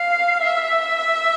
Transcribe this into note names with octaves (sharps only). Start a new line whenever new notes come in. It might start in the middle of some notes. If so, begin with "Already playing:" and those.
Already playing: F5
E5